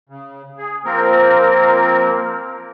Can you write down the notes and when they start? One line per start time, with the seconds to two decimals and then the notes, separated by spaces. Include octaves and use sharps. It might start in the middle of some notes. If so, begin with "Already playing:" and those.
0.09 C#3
0.58 G#4
0.85 F3 A#3 C4 A#4